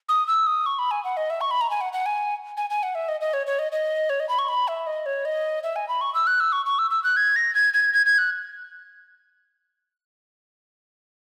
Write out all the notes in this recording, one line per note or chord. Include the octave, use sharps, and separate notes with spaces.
D#6
E6
D#6
C#6
B5
G#5
F#5
D#5
E5
C#6
B5
A#5
G#5
F#5
F#5
G#5
G#5
G#5
F#5
E5
D#5
D#5
C#5
C#5
D#5
D#5
C#5
D#5
B5
C#6
B5
E5
D#5
C#5
D#5
E5
G#5
B5
C#6
E6
F#6
E6
C#6
C#6
E6
E6
F#6
G#6
A#6
G#6
G#6
G#6
G#6
F#6